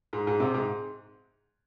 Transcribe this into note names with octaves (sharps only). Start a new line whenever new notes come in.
G#2
G#2
C3
G#2